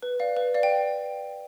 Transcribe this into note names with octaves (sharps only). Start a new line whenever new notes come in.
B4
D5 F5
B4
D5 F5
G5